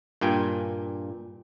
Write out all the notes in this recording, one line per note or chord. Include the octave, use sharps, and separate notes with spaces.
G2 A#2 G5 G#5